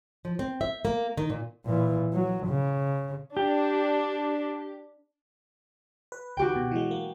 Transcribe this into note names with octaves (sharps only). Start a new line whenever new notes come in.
F3
C4
E5
A#3
D#3
A#2
A#2 E3
F#3
C#3
D4 G4
B4
C#2 D#3 F#4 G4 G5
B2
E3 F#3 G#3
A#3